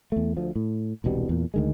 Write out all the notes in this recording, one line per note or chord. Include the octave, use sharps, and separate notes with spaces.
E2 A3
D2 F3
A2
E1 C2 B2 G3
E2 A#2
D2 D#3 G#3